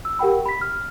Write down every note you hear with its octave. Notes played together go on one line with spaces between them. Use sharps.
E6
G4 A#4 F#5 G5 B5
B5 B6
F6